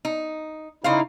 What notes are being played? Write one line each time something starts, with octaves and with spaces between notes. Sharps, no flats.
D#4
C#3 D#4 E4 C5 F5